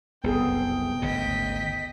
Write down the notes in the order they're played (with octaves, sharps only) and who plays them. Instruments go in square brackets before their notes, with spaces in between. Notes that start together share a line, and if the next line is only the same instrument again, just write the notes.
[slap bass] F#1 C2 [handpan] B3 G#4 A4 [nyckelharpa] G5
[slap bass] G#1 D2 C#3 [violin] D#5 B6